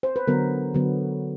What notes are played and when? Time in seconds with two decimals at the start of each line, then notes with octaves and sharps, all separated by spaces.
0.03 C5
0.16 B4
0.27 D3 F#3 B3 A#4
0.74 D3 F#3 B3